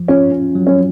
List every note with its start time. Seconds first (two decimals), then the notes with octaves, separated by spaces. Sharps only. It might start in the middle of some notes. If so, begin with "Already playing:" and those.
Already playing: F3
0.08 C#4 F4
0.32 C#4
0.55 F#3
0.67 C#4